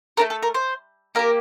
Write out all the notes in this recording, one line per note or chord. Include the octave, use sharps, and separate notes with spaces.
A3 D4 A4 A#4
A4
A#4
C5
A#3 E4 G4 A#4